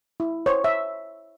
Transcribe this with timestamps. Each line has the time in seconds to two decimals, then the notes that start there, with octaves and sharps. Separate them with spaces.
0.20 E4
0.46 C5 C#5
0.64 E5